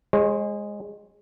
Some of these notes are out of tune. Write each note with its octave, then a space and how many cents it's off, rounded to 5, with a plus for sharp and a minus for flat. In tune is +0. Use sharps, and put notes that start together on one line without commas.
G#3 -5 C#5 -45